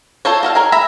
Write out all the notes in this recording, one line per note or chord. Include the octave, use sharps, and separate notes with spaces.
F4 A4 C5 C#5
F#4 A4 F5
G#4 A#4 C#5
E5 A#5 B5